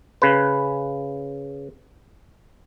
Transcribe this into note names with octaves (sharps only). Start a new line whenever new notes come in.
C#3 B4